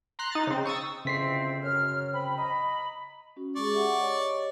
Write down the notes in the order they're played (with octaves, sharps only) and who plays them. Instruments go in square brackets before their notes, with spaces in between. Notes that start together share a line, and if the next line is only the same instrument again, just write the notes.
[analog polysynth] A#5 C6 F#6
D#4 A6
C#3 C4
C#6 D#6 E6 A6
[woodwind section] F2 E3 C4 [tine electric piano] C#3 B6 C7
[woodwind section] F#2 F6
C4 B5
D#5 A#5 B5
[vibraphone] C#4 F#4
[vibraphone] G#3 G#4 [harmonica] D5 C#6
[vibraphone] G4 E5 F#5
G4 C#5 D#5